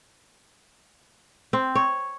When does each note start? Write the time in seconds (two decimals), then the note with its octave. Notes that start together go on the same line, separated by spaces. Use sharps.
1.53 C4
1.75 C#5